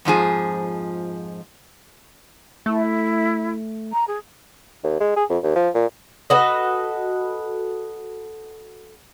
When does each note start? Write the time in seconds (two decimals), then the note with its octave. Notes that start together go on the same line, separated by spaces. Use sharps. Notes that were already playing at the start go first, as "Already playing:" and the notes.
0.05 F2 G#2 F3 G#4
2.66 A3 E4
3.92 A#5
4.07 G#4
4.84 D#2
5.00 G#3
5.16 G#4
5.30 F2
5.43 D#2
5.56 F3
5.74 A#2
6.30 F#4 A4 B4 D#5